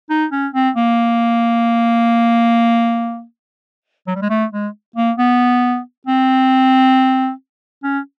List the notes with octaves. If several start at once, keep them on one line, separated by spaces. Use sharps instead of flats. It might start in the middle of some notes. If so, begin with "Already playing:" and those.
D#4
C#4
C4
A#3
F#3
G3
G#3
A3
G#3
A#3
B3
C4
C#4